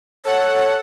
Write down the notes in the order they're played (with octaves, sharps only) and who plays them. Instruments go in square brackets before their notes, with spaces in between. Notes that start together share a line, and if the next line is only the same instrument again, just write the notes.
[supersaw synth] A4 F#5 [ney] C#5